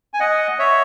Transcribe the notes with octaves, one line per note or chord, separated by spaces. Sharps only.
G#5
D#5 F#5
C#5 E5